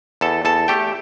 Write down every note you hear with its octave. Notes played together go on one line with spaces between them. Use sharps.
E2 A4 A5
E2 A4 A5
A3 G4 G5